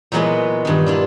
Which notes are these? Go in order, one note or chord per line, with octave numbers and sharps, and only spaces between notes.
A#2 E3 F#3 G#3 B3
G2 D#3
D4 E4 F4